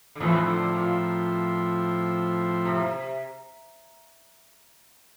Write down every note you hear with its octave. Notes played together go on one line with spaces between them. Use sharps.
D3
E2 A2 E3 F3 C4 E4
D3
A#2
C3